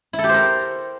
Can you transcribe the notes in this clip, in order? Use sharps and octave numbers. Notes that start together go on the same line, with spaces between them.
E4
A4
G4
C5
A#4